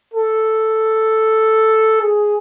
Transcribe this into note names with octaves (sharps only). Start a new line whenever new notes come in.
A4
G#4